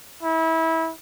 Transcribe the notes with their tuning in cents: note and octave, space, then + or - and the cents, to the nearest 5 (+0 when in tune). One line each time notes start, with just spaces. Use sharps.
E4 -25